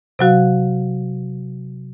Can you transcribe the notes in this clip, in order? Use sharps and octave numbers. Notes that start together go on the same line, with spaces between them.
C3 F#3 F#4 F5